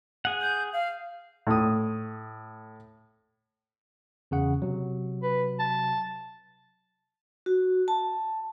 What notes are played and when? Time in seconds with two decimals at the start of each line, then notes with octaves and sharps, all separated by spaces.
0.25 G#4 F#5
0.42 G6
0.73 F5
1.47 A2 D#6
4.31 E2 C#3 F#5
4.62 C3 F#3
5.23 B4
5.60 A5
7.46 F#4
7.88 A5